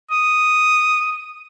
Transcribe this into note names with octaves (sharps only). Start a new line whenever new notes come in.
D#6